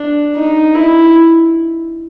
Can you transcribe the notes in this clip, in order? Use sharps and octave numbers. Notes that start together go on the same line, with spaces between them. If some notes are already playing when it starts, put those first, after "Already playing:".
Already playing: D4
D#4
E4